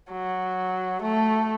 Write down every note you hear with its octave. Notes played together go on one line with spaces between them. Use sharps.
F#3
A3